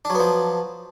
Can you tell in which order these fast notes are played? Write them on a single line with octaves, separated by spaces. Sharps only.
D4 F#3 B3 F3